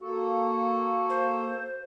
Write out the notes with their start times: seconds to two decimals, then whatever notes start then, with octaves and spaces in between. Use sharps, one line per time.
0.02 A#3 F#4 A4
1.10 C5